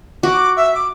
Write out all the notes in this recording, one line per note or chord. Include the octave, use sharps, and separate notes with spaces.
F#4 D6
E5
D6